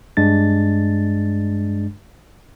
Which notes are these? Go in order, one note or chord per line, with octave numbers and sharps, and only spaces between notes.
G2 G#3 D4 A6